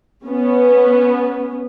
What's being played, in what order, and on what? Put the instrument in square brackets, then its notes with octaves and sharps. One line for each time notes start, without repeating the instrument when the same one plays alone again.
[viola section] B3 C#4